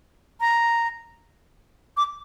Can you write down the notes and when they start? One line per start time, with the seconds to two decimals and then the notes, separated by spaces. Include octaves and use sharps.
0.41 A#5
1.97 D6